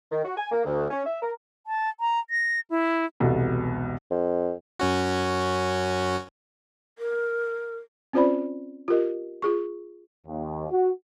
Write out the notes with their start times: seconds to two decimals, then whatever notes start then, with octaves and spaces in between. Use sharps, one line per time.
0.12 D#3
0.25 F#4
0.37 G#5
0.52 A#3
0.65 D2
0.90 C#4
1.06 E5
1.22 A#4
1.67 A5
2.00 A#5
2.30 A#6
2.70 E4
3.20 E1 C2 B2 A4
4.11 F2
4.79 F#2 C#4 F#4
6.99 A#4
8.13 C4 C#4 F4 C5 D5 B5
8.88 F4 G4 A#4 D#5
9.42 F4 G#4 C#6
10.27 D#2
10.69 F#4